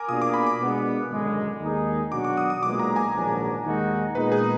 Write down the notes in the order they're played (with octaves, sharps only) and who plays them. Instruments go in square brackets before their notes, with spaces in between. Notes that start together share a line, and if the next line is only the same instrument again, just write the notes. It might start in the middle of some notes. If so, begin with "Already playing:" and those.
Already playing: [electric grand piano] A#4 G#5 D6
[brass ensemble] B2 A#3 D4 F4 G#4 [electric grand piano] D#6
[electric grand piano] D6
B5
D6
[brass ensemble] B2 G#3 B3 D4
G#1 F#2 D3 G#3
D#2 D#3 G#3 D#4 G#4
[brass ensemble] B2 F#3 D4 F#4 [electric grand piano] D6
[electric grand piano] D6
D#6
D#6
[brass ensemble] B1 A#2 G#3 B3 [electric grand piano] D6
[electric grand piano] A#5
G#5
[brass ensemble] A#1 G#2 D#3 F#3 D4
D#2 D#3 G#3 D#4 F#4
[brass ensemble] A#2 G#3 B3 D#4 [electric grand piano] B4
[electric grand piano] G#4